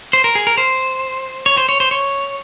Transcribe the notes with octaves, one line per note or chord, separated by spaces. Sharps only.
C5
A#4
G#4
A#4
C5
C#5
C5
C#5
C5
C#5